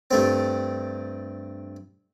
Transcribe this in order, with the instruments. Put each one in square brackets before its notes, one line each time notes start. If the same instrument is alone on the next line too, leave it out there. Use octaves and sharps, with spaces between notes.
[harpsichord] G2 A3 C4